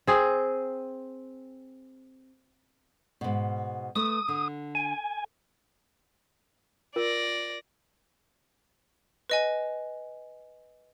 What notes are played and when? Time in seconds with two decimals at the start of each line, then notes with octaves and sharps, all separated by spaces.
0.07 C4 G#4
3.21 G#2 B2
3.95 A3 B4 D#6
4.28 D3
4.75 G#5
6.96 F4 A#4 D5 A#6
9.30 B4 D#5 G#5